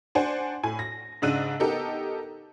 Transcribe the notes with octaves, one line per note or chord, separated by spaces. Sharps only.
D4 C5 F#5 G#5
A2 G#5
A#6
G#2 C#3 D4 E6 F#6 D#7
B3 D#4 G4 A4 A#4